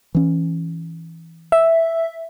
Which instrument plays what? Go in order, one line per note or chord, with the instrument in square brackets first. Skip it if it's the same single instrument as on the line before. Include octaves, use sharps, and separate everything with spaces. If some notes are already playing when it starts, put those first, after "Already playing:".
[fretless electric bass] E3 C#4
[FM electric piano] E5